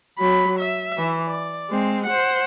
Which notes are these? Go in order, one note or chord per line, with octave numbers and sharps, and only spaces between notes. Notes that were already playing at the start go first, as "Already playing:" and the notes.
F#3 B5
E5
E3
D5
G#3 C4
C5 F#5